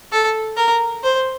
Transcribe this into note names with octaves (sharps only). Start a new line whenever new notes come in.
A4
A#4
C5